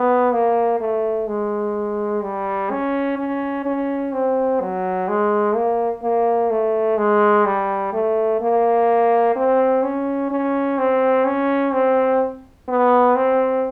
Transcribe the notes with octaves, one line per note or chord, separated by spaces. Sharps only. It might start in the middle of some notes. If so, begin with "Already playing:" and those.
Already playing: B3
A#3
A3
G#3
G3
C#4
C#4
C#4
C4
F#3
G#3
A#3
A#3
A3
G#3
G3
A3
A#3
C4
C#4
C#4
C4
C#4
C4
B3
C4